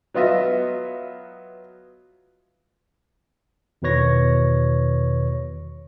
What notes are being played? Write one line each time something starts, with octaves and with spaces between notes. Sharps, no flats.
F#3 B3 F4 D#5 E5
E2 B2 D#3 B4 C#5 A#6